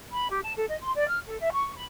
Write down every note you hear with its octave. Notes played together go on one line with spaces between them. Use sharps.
B5
G4
A5
A4
D#5
C6
D5
F6
A4
E5
C#6
B5